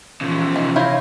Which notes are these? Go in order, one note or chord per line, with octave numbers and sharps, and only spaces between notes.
A#2 C#3 E3 F3
C3 D#3
E4 F4 C#5 G6 A#6